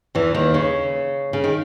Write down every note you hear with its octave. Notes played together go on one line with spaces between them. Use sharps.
E2 E3
D#2 D#3
C#3
C#3
D#3